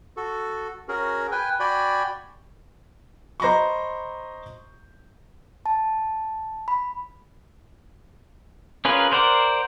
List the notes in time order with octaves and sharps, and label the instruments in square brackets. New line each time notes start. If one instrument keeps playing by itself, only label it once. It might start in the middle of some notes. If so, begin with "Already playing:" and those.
[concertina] F#4 A4
C#4 F#4 G#4 A#4
B4 G5 G#5
F#4 D5 G5 G#5 B5
[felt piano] C5 D#5 A#5 B5 C#6
[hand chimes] A5
B5
[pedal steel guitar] C#4 F4 G#4 A#4 B4
A#4 C5 D5 F#5